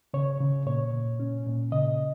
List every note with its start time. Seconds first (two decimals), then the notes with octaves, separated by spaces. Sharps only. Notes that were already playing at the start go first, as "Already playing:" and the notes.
0.14 C#3 C#5
0.40 C#3
0.66 A#2 C#5
0.94 A#2
1.20 C#4
1.46 A#2
1.72 C#3 D#5